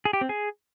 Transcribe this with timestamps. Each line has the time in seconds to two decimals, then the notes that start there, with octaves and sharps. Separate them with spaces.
0.05 G#4
0.13 G4
0.21 C4
0.29 G#4